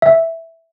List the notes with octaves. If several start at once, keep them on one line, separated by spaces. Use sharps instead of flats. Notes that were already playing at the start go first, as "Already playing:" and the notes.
E5